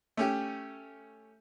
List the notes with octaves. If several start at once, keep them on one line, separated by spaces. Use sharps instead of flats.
A3 C#4 G4